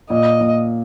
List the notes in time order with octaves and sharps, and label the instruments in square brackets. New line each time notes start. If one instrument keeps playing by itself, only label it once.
[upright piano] A#2 [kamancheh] D#5
[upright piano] A#2